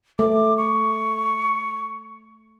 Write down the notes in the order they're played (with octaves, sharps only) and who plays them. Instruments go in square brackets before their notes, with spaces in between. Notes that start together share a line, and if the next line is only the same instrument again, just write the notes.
[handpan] A3 [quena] D6
[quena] C#6